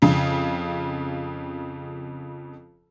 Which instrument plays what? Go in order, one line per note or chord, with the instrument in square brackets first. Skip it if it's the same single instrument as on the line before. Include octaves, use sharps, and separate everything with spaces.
[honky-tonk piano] F2 C#3